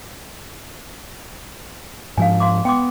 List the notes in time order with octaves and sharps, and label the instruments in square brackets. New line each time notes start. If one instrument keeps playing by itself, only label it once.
[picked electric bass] G#2 F3 D4 [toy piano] F5 G#5
[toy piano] F5 C6 D6
[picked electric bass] B3 [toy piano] G5 C6 D6